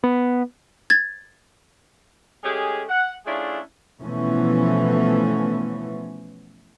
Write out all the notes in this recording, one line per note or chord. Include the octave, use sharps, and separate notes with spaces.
B3
G#6 A6
G#3 A3 C#4 G4 G#4
F#5
A3 C#4 D4 E4 F4 G#4
B2 E3 F3 A3 B3 C#4